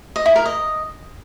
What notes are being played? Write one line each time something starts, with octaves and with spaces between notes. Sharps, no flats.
D#5
E4
A#4
D#5